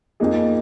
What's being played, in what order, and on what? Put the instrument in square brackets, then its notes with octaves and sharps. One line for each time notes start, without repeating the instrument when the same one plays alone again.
[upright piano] F2 F3 A#3 D#4 G#4